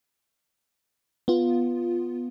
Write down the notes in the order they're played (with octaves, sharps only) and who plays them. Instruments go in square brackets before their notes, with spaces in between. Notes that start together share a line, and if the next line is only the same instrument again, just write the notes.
[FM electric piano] B3 F4